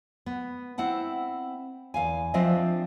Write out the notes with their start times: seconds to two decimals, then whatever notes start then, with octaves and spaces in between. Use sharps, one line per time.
0.26 B3
0.78 C4 E4 F#5 A5
1.94 E2 F5 G#5
2.34 F3 C4 D4 F4 D#5 E5